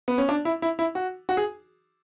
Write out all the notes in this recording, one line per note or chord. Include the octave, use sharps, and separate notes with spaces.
B3
C#4
D4
E4
E4
E4
F#4
F#4
G#4